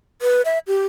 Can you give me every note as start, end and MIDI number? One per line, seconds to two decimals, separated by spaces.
0.22 0.41 71
0.45 0.58 76
0.67 0.87 67